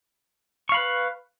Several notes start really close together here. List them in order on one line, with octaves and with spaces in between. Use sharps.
C#6 F5 B5 B4